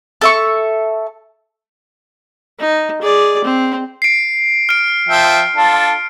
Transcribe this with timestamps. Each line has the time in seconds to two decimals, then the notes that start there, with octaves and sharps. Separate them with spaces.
0.21 A4 E5 C#6
2.60 D#4
3.02 G#4 D5
3.45 C4
4.02 C7 D7
4.69 F6 D7
5.09 F3 E5 G5
5.56 D4 F4 A4